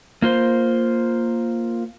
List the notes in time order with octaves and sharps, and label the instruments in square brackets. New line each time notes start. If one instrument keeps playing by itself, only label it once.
[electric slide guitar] A#3 F4 C5